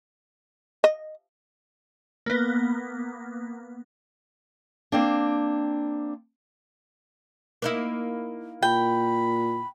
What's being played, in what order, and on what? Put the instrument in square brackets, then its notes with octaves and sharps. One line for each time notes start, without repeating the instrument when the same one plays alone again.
[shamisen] D#5
[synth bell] A#3 B3
[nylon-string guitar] A#3 C4 D4
[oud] A#3 D#4 E4
[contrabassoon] A#2 [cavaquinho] G5 [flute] B5